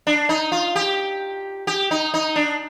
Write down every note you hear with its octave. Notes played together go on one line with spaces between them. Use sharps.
D4
D#4
F4
G4
G4
D#4
D#4
D4